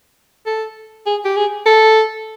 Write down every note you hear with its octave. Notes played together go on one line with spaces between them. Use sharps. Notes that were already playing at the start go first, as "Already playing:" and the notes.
A4
G#4
G4
G#4
A4